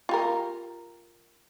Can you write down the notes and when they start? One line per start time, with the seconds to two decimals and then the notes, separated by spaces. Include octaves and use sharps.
0.09 F4 G4 A#4